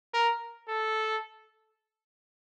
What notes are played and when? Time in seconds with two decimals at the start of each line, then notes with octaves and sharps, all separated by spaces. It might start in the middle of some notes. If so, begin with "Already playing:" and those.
0.14 A#4
0.68 A4